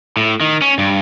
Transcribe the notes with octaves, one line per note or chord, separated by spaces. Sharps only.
A2
D#3
C#4
G2